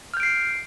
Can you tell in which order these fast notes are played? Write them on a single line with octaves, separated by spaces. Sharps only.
F6 G6 D7 C7